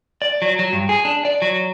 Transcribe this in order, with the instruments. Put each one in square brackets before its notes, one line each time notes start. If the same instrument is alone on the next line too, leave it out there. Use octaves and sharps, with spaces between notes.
[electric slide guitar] D5
F#3
F#3
G2
G#4
D4
D5
F#3